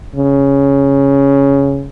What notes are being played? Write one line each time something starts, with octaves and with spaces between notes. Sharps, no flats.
C#3